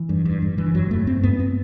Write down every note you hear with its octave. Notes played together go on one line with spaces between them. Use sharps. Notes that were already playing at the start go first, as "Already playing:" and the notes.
Already playing: E3
G2
G2
G2
G2 E3
G2 F#3
G2 A3
G2 C4
G2 B3
C4